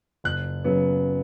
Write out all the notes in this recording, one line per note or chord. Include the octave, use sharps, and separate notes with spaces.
F#1 F#6
C#3 F#3 B3